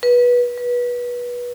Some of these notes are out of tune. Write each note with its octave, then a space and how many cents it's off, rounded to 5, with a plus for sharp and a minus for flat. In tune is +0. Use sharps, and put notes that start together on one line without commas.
B4 -20
B4 -25